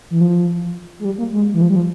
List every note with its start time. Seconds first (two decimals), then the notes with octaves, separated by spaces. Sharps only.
0.10 E3
0.21 F3
0.99 G#3
1.05 G3
1.18 A#3
1.32 G#3
1.54 E3
1.62 F3
1.70 G3
1.76 F3